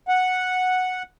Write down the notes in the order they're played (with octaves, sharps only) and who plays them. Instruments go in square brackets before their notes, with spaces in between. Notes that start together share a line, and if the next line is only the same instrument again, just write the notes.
[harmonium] F#5